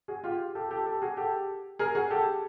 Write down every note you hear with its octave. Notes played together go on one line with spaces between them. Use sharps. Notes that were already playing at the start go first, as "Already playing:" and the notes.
F#4 G#4
F4 G4
G4 A4
G4 A4
G4 A4
F#4 G#4
G4 A4
G#4 A#4
F#4 G#4
G4 A4